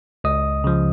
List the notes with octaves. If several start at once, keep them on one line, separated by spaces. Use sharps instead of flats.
C#2 D#5 D#6
C#3 F3